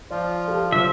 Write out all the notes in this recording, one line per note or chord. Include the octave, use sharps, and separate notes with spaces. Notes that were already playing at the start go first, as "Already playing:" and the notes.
F3 F4 D5
G4 A4
D3 F#3 F4 C5 E5